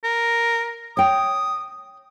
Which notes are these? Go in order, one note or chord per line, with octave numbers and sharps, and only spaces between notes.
A#4
C#5 G5 D#6